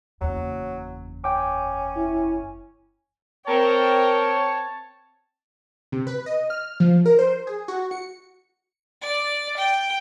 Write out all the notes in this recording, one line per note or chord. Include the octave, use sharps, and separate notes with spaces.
F#1 E2 F#3
C#4 G5 D6
E4
C4 A#4 C#5 G5 A5
C3
B4
D#5
F6
F3
A#4
C5
G#4
F#4
C#7
D5
G5